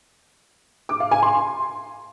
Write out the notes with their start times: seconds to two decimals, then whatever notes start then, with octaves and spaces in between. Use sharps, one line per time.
0.89 D6
1.00 F5
1.11 G#5
1.23 C6